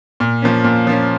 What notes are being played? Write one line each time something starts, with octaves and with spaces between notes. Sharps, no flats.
A#2
F3 A#3 C#4
A#2
F3 A#3 C#4